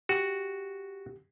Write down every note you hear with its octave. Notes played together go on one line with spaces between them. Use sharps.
F#4 G4